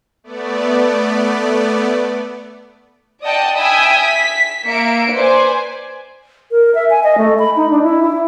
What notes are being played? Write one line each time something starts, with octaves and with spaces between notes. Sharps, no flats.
A3 B3 D5
D5 D#5 F#5 G5 A5 D#6
E5 G5 G#5 B5 D#6 E6
B6
A#3 E5 C#7 D7
B4 C5 D5 G#5
A#4
E5
G#5
D#5
A3
B5
D#4
D4
E4
E4